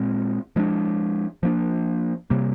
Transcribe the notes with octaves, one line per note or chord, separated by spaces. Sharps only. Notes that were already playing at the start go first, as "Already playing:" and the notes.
Already playing: A#2 G#3 C4
F3 G#3 D4
F3 A#3 D4
C3 G3 A#3